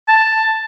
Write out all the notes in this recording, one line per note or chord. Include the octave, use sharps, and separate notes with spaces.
A5